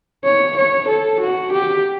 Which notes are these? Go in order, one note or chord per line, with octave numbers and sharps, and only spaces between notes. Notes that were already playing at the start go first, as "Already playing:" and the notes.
C#5
C#5
A4
F#4
G4